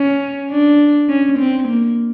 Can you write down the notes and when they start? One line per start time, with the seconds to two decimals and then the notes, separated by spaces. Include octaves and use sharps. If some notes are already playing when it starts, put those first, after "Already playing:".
Already playing: C#4
0.51 D4
1.09 C#4
1.39 C4
1.68 A#3